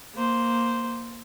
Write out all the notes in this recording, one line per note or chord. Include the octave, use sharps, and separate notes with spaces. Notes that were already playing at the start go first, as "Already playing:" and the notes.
A#3 C5